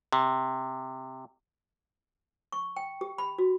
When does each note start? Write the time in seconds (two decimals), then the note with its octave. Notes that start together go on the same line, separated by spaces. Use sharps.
0.13 C3
2.52 C#6
2.76 G5
3.01 G4
3.18 B5
3.38 F#4